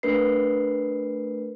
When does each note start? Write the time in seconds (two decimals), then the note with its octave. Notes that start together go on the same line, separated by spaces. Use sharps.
0.03 A3 D4 A#4 B4 C7